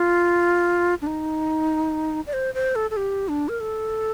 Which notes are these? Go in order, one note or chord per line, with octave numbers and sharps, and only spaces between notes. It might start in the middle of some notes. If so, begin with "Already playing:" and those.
Already playing: F4
D4
D#4
D5
C5
C5
A4
A4
G4
D4
A#4
A4